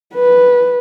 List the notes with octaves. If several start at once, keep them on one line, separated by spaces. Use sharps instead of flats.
B4